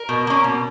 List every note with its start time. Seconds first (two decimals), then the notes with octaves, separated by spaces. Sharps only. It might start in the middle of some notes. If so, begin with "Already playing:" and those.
Already playing: A#4
0.09 B2
0.27 A#3 C#4
0.44 B2